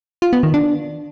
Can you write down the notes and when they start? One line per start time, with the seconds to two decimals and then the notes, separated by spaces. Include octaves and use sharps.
0.22 F4
0.33 B3
0.43 D#3
0.54 D4